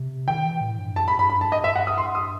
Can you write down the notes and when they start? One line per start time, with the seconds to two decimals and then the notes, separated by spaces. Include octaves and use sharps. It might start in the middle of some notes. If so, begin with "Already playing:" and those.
Already playing: C3
0.27 D#3 G5
0.45 E3
0.61 A2
0.79 G2
0.96 F#2 A5
1.08 B5
1.13 G2
1.19 B5
1.30 B5
1.41 A5
1.52 D#5
1.64 G2 E5
1.76 F#5
1.87 D#6
1.98 C6
2.15 D#6